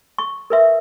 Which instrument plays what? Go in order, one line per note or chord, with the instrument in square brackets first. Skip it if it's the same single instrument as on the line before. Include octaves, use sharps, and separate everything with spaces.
[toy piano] C#6
A#4 B4 E5